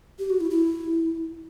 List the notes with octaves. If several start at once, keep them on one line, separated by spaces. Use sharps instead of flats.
G4
F#4
E4
E4